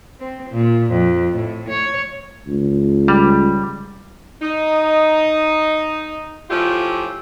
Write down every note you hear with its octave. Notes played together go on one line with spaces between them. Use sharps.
C4
A#2
F2
A2
C#5
C#2
G3
D#4
F3 A3 C#4 E4 F4 G4